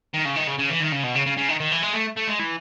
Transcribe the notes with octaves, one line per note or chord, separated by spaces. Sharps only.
D#3
C#3
D#3
C#3
C#3
E3
D#3
C#3
B2
C#3
C#3
C#3
D#3
D#3
E3
G#3
A3
A3
G#3
E3